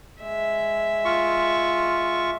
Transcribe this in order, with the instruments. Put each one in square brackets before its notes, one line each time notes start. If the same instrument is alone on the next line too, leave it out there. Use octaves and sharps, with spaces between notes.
[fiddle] G#3 E5
[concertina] F4 C#6